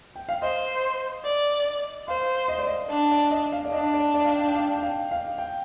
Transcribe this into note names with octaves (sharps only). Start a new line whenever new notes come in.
G5
F5
C5 D#5
D5
C5 F5
D#5
D5
D#5
D4
D5
D#5
F5
D5
D4 D#5
D5
D5
F5
G5
G5
F5
G5
F5
F5
G5